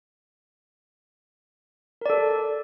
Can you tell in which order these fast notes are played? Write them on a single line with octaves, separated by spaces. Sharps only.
A#4 D5 A4